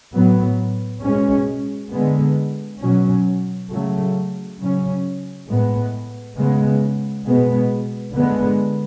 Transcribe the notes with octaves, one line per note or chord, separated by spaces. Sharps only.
A2 F#3 B3
B2 G#3 C#4
D3 G#3 B3
B2 F#3 C#4
C#3 F#3 A3
C#3 F#3 C#4
A2 G#3 B3
C#3 G#3 B3
B2 G#3 B3
D3 G#3 B3